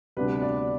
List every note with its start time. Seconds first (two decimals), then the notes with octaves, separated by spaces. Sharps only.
0.17 D2 C3 G3 B3 D4 B4
0.42 D5